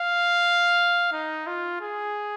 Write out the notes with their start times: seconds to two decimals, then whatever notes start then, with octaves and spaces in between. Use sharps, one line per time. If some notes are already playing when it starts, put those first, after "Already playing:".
Already playing: F5
1.12 D#4
1.47 F4
1.81 G#4